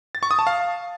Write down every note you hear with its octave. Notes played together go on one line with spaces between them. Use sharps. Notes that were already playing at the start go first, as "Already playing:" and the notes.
A6
C#6
D#6
A5
F5